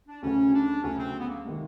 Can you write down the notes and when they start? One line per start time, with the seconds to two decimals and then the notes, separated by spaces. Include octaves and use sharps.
0.08 D4
0.22 D2 C#3 F#3 C#4
0.54 D4
0.83 D2 C#3 F#3 C#4
0.98 C4
1.19 B3
1.29 A#3
1.44 C3 D#3 G#3